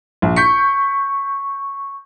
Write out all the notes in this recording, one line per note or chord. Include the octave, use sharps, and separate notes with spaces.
A#1
C#6 G6 B6 C#7